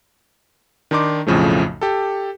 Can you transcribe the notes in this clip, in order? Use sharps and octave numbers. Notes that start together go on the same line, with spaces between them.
D#3 D4 D#4 C6 D6
B1 F2 A2 C#3 F3 A3
G4 A4